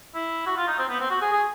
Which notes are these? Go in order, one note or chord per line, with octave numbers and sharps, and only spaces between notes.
E4
F#4
F4
D#4
C4
B3
C4
F#4
G#4
G#4